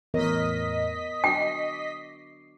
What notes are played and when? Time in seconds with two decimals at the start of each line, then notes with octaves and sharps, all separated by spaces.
0.14 E2 A2 B3 A#4 C#5 D#5 B6
1.24 D4 F#4 G5 D6 C7